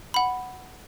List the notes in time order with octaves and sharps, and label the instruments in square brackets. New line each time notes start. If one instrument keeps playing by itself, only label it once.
[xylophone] F#5 B5